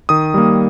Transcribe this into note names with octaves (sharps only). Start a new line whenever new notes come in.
D#3 D#6
G3 A#3